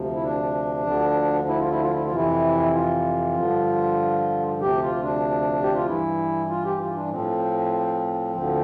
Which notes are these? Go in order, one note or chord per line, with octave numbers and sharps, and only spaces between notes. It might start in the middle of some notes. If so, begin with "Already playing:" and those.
Already playing: D2 C3 F3
E4
D4
D2 D3 F3
E4
F4
E4
F4
E4
F4
F2 C3 E3 E4
F4
G2 D3 F3
D2 C3 F3 G4
F4
D4
G4
F4
G2 E3 E4
F4
G4
F4
D4
A2 F3 C4
D2 D3 F3